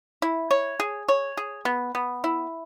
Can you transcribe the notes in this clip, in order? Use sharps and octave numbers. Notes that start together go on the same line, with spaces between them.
E4
C#5
G#4
C#5
G#4
B3
B3
E4